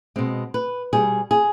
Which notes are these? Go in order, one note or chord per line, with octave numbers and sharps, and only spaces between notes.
B2 G#3 C4
B4
B2 G3 G#4
G#4